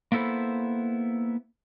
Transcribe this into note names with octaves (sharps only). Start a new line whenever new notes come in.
A#3 B3 E4 A4 C5